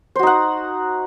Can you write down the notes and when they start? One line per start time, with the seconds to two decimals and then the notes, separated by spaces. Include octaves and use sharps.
0.16 C5
0.19 F#4
0.23 D#4
0.27 F#5